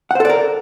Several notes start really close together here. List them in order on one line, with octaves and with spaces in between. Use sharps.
F#5 C5 A4 D5 A#4